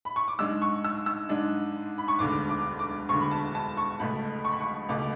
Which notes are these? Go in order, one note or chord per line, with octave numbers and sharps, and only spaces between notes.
B5
C#6
D6
G#2 G#3 D4 E6
C#6
E6
E6
G#2 G#3 D4
B5
C#6
E1 D2 D3 D6
D6
D6
E1 D2 D3 C#6
B5
A5
A5
C#6
C#2 B2 A3 B5
C#6
B5
C#6
C#2 B2 A3 D6